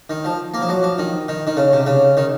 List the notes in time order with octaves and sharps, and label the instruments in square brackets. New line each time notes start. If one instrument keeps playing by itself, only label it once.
[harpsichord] D#3
F3
A#3
F3
F#3
F3
D#3
D#3
D#3
C#3
C3
C#3
D#3